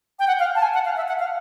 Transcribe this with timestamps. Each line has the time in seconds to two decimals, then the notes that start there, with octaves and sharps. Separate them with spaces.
0.19 G5
0.27 F#5
0.39 F5
0.55 A5
0.62 G#5
0.74 F#5
0.85 F5
0.96 E5
1.08 F#5
1.19 F5